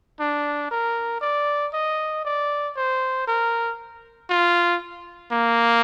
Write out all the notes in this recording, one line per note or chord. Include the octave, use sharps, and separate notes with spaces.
D4
A#4
D5
D#5
D5
C5
A#4
F4
A#3